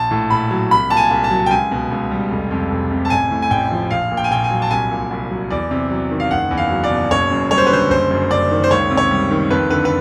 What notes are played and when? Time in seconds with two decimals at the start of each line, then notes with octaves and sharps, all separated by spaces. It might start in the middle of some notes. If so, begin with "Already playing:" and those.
Already playing: A#1 A5
0.11 A2
0.30 A#1 B5
0.51 F#3
0.71 C2 B5
0.90 A#2 A5
0.97 G#5
1.11 C2
1.24 A5
1.31 F#3
1.46 G5
1.50 C#2 G#5
1.71 B2
1.91 C#2
2.11 G3
2.30 F1
2.51 F2
2.71 F1
2.91 C3
3.05 A5
3.10 A1 G#5
3.31 A2
3.42 G#5
3.50 A1 G5
3.71 F3
3.90 A#1 F5
4.11 A#2
4.17 G5
4.24 G#5
4.31 A#1 G5
4.44 G#5
4.50 F#3
4.62 A5
4.71 C2 G#5
4.91 A#2
5.11 C2
5.31 F#3
5.50 E2 D5
5.71 C3
5.91 F#3
6.11 D#3
6.20 F5
6.30 F#1 F#5
6.51 E2
6.57 F5
6.70 F#3
6.84 D5
6.91 B2
7.11 F#1 C#5
7.31 F#2
7.50 G3 C#5
7.58 C5
7.67 B4
7.71 D3 C5
7.90 F#1 C5
8.10 F#2
8.30 F#1 D5
8.51 D#3
8.64 C5
8.70 C#2 C#5
8.90 C3
8.97 C#5
9.11 G3
9.31 D#3
9.51 F2 B4
9.70 D3 B4
9.85 B4